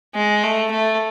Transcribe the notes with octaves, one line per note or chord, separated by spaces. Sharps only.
G#3
A3
A3